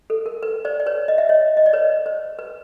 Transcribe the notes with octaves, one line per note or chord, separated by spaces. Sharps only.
A4
A#4
B4
C5 D5
D5
B4 C#5
D#5
E5
C#5 D#5
D#5
D5
B4 C#5
C5
B4